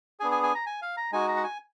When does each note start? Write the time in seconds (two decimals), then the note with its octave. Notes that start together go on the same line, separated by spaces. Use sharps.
0.20 B3 D4 G#4 G#5
0.31 G#5
0.43 G#5
0.55 A#5
0.66 G#5
0.82 F5
0.97 A#5
1.12 G#3 D#4 F#4 G#5
1.28 A#5
1.37 F#5
1.44 G#5